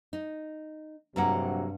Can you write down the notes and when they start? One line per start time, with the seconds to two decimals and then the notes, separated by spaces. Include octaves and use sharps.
0.13 D#4
1.16 A#1 G2 C3 F#3 A#3 A4 F#5 A#5